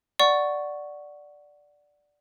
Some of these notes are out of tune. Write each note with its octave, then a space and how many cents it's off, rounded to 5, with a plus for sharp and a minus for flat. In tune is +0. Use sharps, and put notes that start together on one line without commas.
D5 +0 F#5 +0 C#6 +0